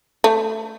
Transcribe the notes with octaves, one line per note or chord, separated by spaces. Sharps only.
A3